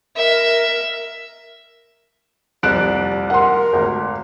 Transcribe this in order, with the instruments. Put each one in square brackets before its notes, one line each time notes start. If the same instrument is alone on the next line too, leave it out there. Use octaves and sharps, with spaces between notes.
[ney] A#4 [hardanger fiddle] E5
[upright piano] F1 C2 [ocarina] D5 [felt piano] F#6 D7
[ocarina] A#4 [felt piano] F#5 C6
[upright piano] G#1 D2